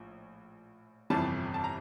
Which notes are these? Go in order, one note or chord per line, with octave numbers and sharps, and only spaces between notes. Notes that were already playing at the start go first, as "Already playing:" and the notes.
Already playing: A#1 A2
G1 F2 C3 E3 G3 A5
A5
A#5